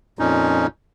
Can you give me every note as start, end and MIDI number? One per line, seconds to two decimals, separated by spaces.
0.19 0.67 41
0.19 0.67 46
0.19 0.67 61
0.19 0.67 63